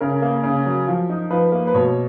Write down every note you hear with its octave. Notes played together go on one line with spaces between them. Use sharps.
C#3 A#4
A#3
C#3
F#3
F3
D#4
F3 B4
A#3
B4
B2 C#5